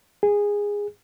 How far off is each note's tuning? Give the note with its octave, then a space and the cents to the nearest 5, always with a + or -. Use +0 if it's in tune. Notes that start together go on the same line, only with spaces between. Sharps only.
G#4 -15